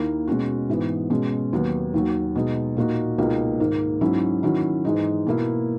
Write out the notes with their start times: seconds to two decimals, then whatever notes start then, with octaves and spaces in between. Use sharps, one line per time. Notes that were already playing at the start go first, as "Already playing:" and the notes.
Already playing: D#2 D#3 A#3 E4
0.27 B2 G#3 C#4 F#4
0.69 G#2 E3 B3
1.10 B2 G#3 C#4
1.53 D#2 D#3 F#3 B3
1.94 D#2 D#3 F#3
2.36 B2 G#3 D#4
2.77 A#2 A#3 D#4 F#4
3.18 C#2 B2 A#3 D#4
3.60 G#2 D#3 A#3
4.01 G#2 F#3 C#4 E4
4.43 D#3 F#3 C#4 E4
4.85 G#2 E3 G#3 D#4
5.27 B2 A#3 E4